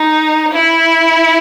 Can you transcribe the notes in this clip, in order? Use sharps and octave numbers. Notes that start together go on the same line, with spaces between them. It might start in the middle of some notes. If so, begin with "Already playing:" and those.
Already playing: D#4
E4